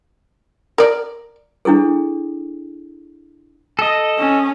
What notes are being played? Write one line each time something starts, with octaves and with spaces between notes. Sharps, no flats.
A#4 D5
D4 E4 G#4 A4
A4 D#5
C#4